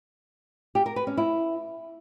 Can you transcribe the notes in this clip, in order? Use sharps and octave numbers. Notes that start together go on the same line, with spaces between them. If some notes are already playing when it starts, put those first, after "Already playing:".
G4
A#4
B4
C#4
E4